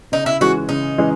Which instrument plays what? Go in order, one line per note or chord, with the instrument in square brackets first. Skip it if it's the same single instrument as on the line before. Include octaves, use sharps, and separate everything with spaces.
[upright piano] C#3 [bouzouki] D#4
[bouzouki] E4
[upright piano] E3 G#3 C#4 G#4 [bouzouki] F#4
[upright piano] C#3 [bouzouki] D#4
[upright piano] E3 G#3 C#4 G#4